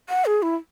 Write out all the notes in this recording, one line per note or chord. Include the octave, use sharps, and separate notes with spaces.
F#5
G#4
E4